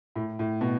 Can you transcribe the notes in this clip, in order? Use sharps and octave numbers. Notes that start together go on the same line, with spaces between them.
A2
A2
B2